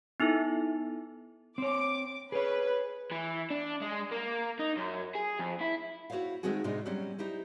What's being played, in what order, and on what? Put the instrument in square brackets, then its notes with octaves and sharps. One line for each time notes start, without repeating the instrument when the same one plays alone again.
[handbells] B3 D#4 E4 A4
[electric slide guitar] C4 C#5 [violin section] D6
[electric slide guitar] G#4 C#5 [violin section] B4
[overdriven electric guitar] E3
D4
G#3
A#3
D#4
F#2
G#4
F2
E4
[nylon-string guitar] E4 F#4 G#4 C5 C#5 F5
D#3 G#3 A3 C4 F#4 G#4
A2 C3 G#3 D4 D#4
F#3 G3 C4 C#4
D#4 E4 G4 C5